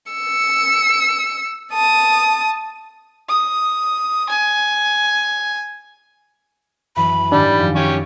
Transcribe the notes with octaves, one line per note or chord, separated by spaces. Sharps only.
E6 C#7
A5 D#6
D#6
G#5
F#2 E3 B5
G#2 D#3 G3 D4
F#2 F3
C#4 G4 C#5